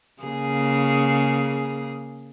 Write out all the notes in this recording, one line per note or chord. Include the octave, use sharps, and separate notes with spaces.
C#3 A#3 G#4